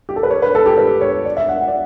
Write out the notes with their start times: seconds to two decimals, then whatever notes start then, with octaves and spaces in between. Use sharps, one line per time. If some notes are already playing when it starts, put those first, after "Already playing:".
0.09 G4
0.16 A4
0.23 B4
0.30 C#5
0.42 B4
0.55 A4
0.66 G4
0.78 B4
1.01 C#5
1.25 D5
1.37 E5
1.49 F#5
1.61 F#5
1.68 D5